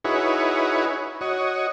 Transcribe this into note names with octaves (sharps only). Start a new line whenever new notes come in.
D#4 E4 F#4 G#4 B4 C#5
F#4 C#5 D#5